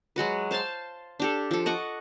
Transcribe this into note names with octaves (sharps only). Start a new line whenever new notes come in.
F#3 G#3 F#4 B4
C5 F5 A5 C6
D4 G4 A4
F3 A4
D#5 F#5 C#6 D6